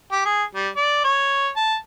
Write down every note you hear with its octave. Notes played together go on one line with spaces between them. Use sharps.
G4
G#4
G3
D5
C#5
A5